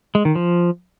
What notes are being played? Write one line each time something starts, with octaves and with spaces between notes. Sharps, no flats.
G#3
D#3
F3